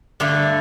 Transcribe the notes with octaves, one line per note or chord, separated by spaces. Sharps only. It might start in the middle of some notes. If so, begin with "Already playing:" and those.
G2 D3 A3